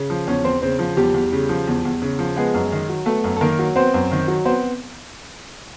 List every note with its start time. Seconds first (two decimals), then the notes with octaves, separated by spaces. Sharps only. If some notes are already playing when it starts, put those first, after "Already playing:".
Already playing: C#3
0.10 F3
0.27 E2 C#4 C#5
0.44 E2 C4 C5
0.62 C#3 C4 C5
0.79 F3
0.97 E2 G3 G4
1.14 E2
1.32 C#3
1.49 F3
1.67 E2
1.85 E2
2.02 C#3
2.19 F3
2.36 G#3 B3 G#4
2.54 F#2
2.72 D#3
2.89 F#3
3.06 A3 B3 A4
3.24 F#2
3.36 A4
3.41 D#3 A#3 A#4
3.59 F#3
3.76 B3 C4 C5
3.94 F#2
4.12 D#3
4.28 F#3
4.45 B3 C4 C5